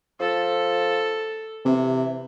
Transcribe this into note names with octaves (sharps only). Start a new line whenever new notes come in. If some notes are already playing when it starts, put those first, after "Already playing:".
F3 A4
C3 E3